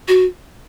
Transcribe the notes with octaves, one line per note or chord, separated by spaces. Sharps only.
F#4